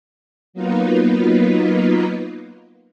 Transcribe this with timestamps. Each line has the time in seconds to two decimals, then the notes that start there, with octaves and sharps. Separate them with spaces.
0.53 F#3 A#3 B3 D#4 F4 B4